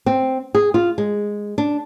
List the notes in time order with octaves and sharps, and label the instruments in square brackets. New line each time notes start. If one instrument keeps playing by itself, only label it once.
[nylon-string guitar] C4
G#4
F4
G#3
D4